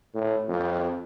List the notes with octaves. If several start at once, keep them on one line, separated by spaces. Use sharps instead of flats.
A2
F2